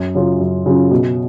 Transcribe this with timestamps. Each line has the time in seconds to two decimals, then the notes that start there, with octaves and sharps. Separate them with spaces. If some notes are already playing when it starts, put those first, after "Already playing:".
Already playing: F#2
0.15 C#3 F#3 C#4 F4
0.40 F#2
0.66 C#3 F#3 C#4 F4
0.91 B2